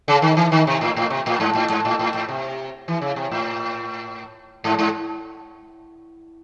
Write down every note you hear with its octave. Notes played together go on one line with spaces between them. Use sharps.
C#3
D#3
E3
D#3
C3
A2
A2
C3
A2
G#2
A2
G#2
A2
A2
A2
C3
E3
C#3
C3
A2
G#2
G#2